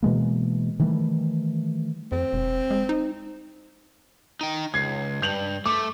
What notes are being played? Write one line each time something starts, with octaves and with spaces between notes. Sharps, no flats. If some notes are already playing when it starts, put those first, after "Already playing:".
B2 E3 G#3 A#3
D#3 E3 G3 A3
F2 C4
E1
G#3
D#4
D#4 G5
C#2 G#6 C7
G2 G6 F7 F#7
A3 D6